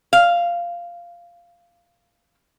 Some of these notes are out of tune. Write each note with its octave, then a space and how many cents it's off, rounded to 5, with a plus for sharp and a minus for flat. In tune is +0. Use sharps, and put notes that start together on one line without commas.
F5 -10